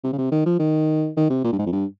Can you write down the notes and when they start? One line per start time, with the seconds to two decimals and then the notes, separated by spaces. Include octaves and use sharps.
0.04 C3
0.13 C#3
0.18 C3
0.32 D#3
0.46 F3
0.59 D#3
1.17 D#3
1.30 C3
1.44 A#2
1.52 G2
1.59 G#2
1.66 F2
1.72 G2